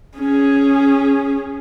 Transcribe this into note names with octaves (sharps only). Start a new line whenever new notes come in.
C#4 G#4